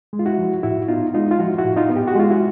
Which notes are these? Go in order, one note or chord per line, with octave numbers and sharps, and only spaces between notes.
G#3
F4
E4 F#4
F3
A2 E4 F#4
B3 D#4 F4
G#3 D#4 F4
F4
F3 E4 F#4
E4 F#4
A2
D#4 F4
B3
G4
F#4
G#3 F4
E4 F#4